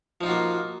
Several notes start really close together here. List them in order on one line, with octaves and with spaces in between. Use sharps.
F3 D#4 F4 F#4 A#3